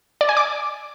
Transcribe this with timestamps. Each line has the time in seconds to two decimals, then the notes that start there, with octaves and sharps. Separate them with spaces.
0.21 D5
0.29 G#5
0.37 D6